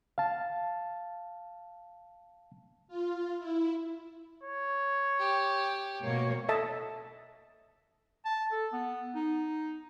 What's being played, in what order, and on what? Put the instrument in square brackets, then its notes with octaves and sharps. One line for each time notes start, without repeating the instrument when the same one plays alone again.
[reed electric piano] F5 A5
[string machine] F4
E4
[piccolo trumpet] C#5
[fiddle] G4
[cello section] B2 A#3 C#5
[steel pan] A4 D#5 E5 A5
[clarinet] A5
A4
B3
D#4